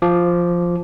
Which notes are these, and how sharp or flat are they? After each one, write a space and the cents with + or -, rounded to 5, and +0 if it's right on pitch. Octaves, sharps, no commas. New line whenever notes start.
F3 +0 D6 -10